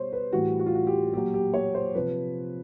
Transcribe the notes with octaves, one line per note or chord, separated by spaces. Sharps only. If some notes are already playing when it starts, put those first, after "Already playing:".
Already playing: B2 G3 C5 C#5
B4
A2 E3 G3 F#4
F#4
F4
F#4
G4
A#2 F#3 G4
G4
C#5
C5
C3 F3 B4